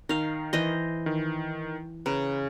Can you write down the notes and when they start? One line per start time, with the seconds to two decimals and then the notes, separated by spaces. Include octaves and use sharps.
0.09 D#3 D#4 F5
0.53 E3 C5 D#5
1.06 D#3
2.06 C#3 B4 A#5